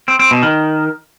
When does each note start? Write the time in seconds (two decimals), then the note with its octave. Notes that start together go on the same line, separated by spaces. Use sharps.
0.08 C4
0.19 C4
0.31 B2
0.43 D#3